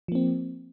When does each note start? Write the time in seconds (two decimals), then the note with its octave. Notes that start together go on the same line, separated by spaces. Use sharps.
0.08 F3
0.12 A#3
0.15 C4